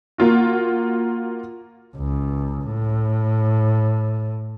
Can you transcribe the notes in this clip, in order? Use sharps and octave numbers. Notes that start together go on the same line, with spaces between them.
A#3 F4 F#4
C#2
A2